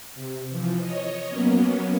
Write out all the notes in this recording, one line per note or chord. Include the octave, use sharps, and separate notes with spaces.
C3
E3 F3
C#5 D#5
F#3 A#3 B3 C#4